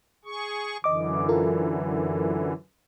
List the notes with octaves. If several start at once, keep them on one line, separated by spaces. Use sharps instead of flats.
G#4 C#6
F#2 D3 E3 D#5 D6
F4 A4 A#4